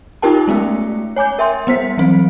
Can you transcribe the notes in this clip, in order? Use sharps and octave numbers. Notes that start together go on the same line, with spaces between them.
D#4 F4 G4 A#4 G5 A5
G#3 A3 B3 C#4
C#5 G#5 D6 G6
A#4 E5 G5 C6
G3 B3 C5 B6
E3 F#3 C4